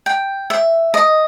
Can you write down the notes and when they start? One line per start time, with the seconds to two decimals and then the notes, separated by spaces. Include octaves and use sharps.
0.06 G5
0.50 E5
0.94 D#5